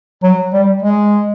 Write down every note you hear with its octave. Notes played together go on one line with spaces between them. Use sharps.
F#3
G3
G#3